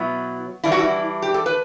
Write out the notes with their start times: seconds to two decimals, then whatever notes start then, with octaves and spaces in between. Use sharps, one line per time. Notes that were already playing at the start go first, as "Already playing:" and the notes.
Already playing: B2 F#3 B3 E4
0.64 E3 G3 D4 E4
0.72 F#4
0.79 E4
1.22 G4
1.34 A4
1.46 B4